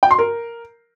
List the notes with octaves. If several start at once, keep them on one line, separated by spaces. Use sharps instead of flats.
G5
C6
A#4